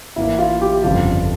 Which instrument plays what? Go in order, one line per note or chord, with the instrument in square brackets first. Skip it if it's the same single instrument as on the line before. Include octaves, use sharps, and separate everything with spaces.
[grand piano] A1 A2 E3 A#3 E4
F4
G4
G1 F2 C#3 F4